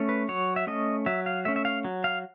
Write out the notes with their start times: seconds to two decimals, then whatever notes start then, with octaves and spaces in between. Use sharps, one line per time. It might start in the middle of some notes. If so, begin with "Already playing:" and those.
Already playing: A3 C#4
0.09 B4
0.29 F#3 C#5
0.56 E5
0.67 A3 C#4 D#5
1.06 F#3 E5
1.26 F5
1.45 A3 C#4 E5
1.56 E5
1.65 F5
1.85 F#3
2.04 F5